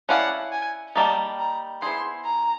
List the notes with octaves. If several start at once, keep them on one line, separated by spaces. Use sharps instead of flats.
C#4 E4 A4 D5 F5 F#5
G#5
G3 A#3 D#4 A5
A#5
B3 E4 G#4 C5 C6
A#5